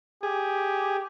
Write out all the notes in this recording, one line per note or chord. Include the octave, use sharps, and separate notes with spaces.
G4 G#4